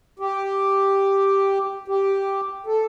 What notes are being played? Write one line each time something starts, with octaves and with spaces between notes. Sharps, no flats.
G4
G4
A4